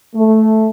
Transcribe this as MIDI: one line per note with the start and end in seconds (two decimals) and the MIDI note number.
0.14 0.68 57